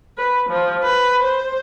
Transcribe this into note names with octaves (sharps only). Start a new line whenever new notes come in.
B4
F3
B4
C5